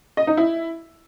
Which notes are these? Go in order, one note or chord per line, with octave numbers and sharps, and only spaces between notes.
D#5
D#4
E4